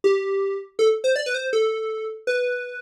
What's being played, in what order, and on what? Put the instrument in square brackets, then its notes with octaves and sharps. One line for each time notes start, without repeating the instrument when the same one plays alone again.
[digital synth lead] G4
A4
C5
D5
B4
C5
A4
B4